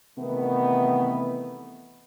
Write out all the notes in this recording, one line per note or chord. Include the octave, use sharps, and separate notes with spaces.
C3 D#3 E3 A3 B3